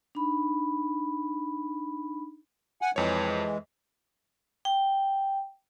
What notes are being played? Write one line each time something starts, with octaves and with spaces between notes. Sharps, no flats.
D4 D#4 B5
F#5 G#5
F2 E3 G#3 C#5
G5